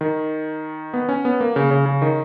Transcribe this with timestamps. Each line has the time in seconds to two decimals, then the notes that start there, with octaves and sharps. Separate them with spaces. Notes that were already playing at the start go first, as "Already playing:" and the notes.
0.01 D#3
0.94 B3
1.09 C#4
1.25 B3
1.40 A#3
1.56 C#3
1.71 C#3
1.86 C#3
2.02 D#3